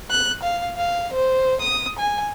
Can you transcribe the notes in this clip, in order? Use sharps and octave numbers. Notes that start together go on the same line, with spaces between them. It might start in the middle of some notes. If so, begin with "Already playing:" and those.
F#6
F5
F5
C5
D#6
G#5